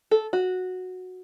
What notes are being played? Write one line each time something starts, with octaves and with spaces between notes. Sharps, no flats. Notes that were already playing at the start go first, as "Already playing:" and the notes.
A4
F#4